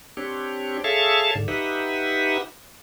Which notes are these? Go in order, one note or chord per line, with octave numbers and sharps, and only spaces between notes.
C4 D4 G4 C#5
G#4 A4 C#5 E5 F5 A5
G#2 D3
D#4 G4 B4 E5 F#5